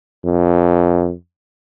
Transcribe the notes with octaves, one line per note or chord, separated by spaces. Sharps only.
F2